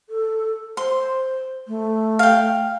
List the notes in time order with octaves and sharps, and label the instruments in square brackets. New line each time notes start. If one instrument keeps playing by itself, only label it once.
[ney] A4
[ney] C5 [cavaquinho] C6
[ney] A3
[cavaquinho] F5 G5